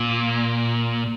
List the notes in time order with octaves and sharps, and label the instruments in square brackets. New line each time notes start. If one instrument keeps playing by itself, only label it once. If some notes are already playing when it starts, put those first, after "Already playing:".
Already playing: [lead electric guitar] A#2